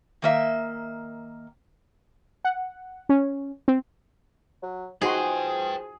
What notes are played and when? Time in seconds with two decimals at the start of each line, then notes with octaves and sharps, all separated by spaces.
0.22 D#3 A#3 E5
2.45 F#5
3.09 C#4
3.68 C4
4.63 F#3
5.01 F3 D#4 F#4 G#4 B4 G5 C6